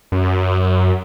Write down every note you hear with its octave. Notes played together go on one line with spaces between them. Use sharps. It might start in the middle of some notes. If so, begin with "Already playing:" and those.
F#2